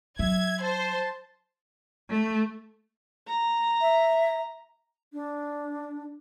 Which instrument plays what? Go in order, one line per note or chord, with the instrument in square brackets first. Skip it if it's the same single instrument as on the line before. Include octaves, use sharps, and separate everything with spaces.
[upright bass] F#3 [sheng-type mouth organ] E5 [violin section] G#6
[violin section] C5 [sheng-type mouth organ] A5
[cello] A3
[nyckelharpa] A#5
[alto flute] E5
D4